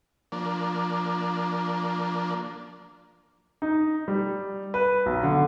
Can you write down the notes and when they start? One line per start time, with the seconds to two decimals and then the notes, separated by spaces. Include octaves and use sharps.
0.32 F3 A#3 D4
3.62 D#4
4.08 G3
4.74 B4
5.06 B1
5.23 D3